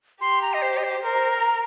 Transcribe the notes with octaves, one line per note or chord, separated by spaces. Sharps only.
G4 C6
A#5
D#5
C5
D#5
C5
A#4 C5
A#5